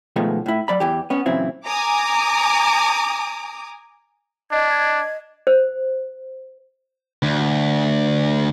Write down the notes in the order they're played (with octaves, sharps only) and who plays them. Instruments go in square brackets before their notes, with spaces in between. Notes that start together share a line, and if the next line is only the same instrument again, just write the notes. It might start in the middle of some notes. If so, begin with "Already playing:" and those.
[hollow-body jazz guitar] B2 D#3 F3 G#3 A3 B3
A2 E4
F#3 D5 B5
E2 E3 G4
B3 C#4
A#2 C#3 E3 F#3 C4 E4
[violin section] G#5 A#5 D6 D#6
[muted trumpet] D4 [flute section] D#5 G#6
[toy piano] C5
[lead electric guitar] D2